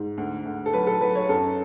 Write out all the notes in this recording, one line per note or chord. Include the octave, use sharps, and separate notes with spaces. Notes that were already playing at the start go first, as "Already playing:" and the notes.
Already playing: G#2
D2
D2
A4
F#3 B4
A4
F#3 B4
C#5
F#2 A4